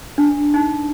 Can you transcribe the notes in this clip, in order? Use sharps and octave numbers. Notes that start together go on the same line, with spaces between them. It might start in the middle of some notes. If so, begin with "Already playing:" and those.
D4
D#4